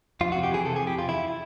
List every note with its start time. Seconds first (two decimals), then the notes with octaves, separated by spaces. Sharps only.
0.21 F2 F4
0.32 F#4
0.35 C3
0.43 G4
0.51 E3 G#4
0.65 C3 A4
0.76 G#4
0.80 F2
0.87 G4
0.95 F2 F4
1.09 E2 E4